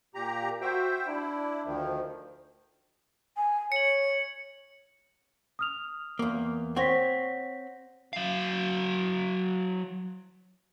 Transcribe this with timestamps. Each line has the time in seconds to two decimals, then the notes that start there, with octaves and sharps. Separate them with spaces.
0.15 A#2 G4 A#5
0.61 F#4 C5 E5 G5
1.07 D4 E4
1.66 D2 D#3 F3
3.37 G#5
3.72 C#5 C#7 F#7
5.59 D#6 F6 F7
6.19 E2 A#3
6.76 C4 C#5 F#5 A#6 B6
8.13 F#3 F5